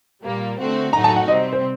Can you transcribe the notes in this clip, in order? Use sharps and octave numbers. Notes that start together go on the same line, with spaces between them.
A#2 G3 A#3
D3 A3 C4 F#4
A2 F#3 A3 D#4 F#4 A#5
A5
F#5
C3 G3 C4 D#5
C5